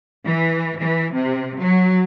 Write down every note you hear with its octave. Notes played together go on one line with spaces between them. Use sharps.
E3
E3
C3
F#3